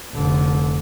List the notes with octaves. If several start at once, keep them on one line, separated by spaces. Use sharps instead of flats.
F1 D3